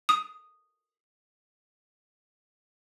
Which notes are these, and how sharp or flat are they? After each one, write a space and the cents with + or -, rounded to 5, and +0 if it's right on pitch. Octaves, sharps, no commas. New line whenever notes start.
D#6 -5